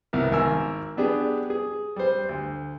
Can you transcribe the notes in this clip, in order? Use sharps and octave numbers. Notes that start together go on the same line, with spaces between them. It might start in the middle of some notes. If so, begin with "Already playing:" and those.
C2 B3 A#4
G#1 A#4 G#5 E6
B3 D4 G4 G#4
G#4
G3 C5
D2